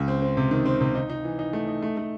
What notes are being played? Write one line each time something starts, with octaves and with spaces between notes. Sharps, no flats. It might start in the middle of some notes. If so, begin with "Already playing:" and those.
Already playing: C#2
C4
C4
C3
D#3
C4
C3
D#4
D#4
E3
D#4
A3
D#4
A3
A3